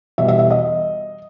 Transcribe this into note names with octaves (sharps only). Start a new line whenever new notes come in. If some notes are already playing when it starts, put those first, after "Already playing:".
E2 B2 G3 E5
E5
E5
D#5